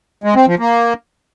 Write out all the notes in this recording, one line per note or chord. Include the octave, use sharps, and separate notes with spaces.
G#3
C4
F3
A#3